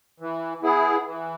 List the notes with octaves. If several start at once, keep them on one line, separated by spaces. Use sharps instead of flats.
E3
B3 E4 G#4
E3